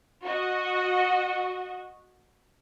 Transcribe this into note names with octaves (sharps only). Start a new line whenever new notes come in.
F#4 D#5